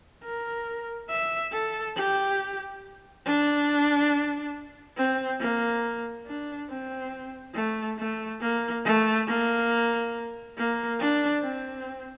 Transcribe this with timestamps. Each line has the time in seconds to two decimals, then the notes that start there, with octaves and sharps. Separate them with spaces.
0.24 A#4
1.10 E5
1.53 A4
1.97 G4
3.26 D4
4.97 C4
5.40 A#3
6.26 D4
6.70 C4
7.55 A3
7.99 A3
8.41 A#3
8.85 A3
9.27 A#3
10.57 A#3
11.00 D4
11.43 C4